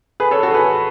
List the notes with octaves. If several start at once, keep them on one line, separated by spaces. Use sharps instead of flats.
G#4 B4
A4 C#5
F#4 A4
G#4 B4